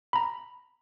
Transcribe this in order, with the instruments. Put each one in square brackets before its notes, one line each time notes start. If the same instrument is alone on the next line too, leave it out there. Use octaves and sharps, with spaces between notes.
[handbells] A#5 B5